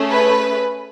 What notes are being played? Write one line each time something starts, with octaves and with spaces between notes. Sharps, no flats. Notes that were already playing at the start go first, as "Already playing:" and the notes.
Already playing: A3 C#4 G#4
B4